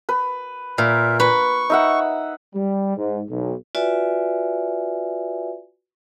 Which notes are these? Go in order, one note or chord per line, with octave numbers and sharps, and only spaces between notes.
B4
A#2 A#4 E5
B4 C#6
D#4 E5 F#5
G3
G#2
B1
F4 F#4 B4 D5 E5 G#5